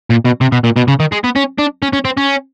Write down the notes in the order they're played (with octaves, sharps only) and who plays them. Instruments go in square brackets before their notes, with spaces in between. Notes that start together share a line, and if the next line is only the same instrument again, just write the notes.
[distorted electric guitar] A#2
B2
C3
B2
A#2
B2
C#3
D#3
G#3
B3
C#4
D4
C#4
C#4
C4
C#4